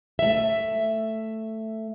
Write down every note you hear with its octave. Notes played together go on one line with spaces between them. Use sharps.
A3 E5